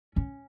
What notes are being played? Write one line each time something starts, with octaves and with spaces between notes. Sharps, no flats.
C#4